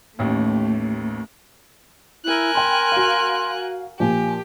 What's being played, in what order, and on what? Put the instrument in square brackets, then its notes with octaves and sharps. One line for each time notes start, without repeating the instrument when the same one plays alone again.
[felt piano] A1 D#2 [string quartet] A3
[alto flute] E4 [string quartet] A#4 G#5 F#6
[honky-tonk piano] G5 B5 [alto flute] C6
[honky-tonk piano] F#4 F5
[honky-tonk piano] A#2 F3 [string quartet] G4 [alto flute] G#5